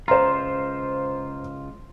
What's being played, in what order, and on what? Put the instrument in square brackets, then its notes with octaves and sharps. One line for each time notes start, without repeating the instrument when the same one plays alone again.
[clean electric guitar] C#2 F4 [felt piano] C5 A#5